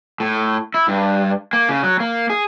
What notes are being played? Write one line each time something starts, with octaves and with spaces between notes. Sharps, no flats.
A2
E4
G2
A#3
C#3
F#3
A#3
G#4